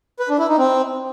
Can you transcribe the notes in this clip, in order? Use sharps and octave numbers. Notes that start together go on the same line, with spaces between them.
B4
D4
E4
D#4
C4